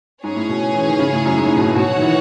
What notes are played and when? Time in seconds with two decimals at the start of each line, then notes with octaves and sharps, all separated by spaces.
0.23 G#2 C#4 G#4 C#5 G#5
0.36 A2
0.49 B2
0.74 E3
0.87 D#3
0.99 C#3
1.13 A2
1.25 F#2
1.37 G#2
1.48 A2
1.57 B2
1.66 A2
1.76 B2 F#4 C#5 F#5
1.97 D#3
2.02 E3